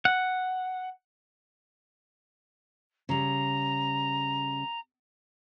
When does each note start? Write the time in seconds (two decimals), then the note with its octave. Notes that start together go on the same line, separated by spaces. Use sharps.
0.05 F#5
3.09 C#3 G3 A#5